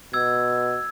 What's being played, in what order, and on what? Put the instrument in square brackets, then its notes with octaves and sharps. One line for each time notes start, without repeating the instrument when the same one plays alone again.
[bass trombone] B2 [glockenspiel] E6 G#6